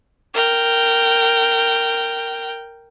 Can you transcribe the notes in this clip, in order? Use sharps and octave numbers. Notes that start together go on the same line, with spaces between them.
A#4 G5